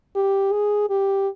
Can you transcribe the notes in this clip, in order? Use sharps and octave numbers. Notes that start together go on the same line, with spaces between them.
G4
G#4
G4